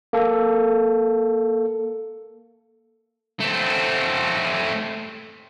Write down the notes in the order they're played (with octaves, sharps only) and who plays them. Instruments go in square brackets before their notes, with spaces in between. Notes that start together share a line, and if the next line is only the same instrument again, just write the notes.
[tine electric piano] A#3 A4
[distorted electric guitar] A3 C4